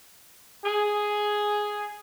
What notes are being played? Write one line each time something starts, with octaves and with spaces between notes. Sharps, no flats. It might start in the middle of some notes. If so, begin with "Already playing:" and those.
G#4